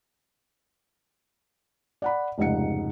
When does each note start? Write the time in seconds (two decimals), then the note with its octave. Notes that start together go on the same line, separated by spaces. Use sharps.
2.02 D5 F#5 B5
2.38 F1 C#2 G#2 D#4 F#5 C#7